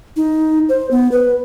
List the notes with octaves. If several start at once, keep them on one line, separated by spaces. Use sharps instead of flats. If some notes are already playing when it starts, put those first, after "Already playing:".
D#4
C5
B3
B4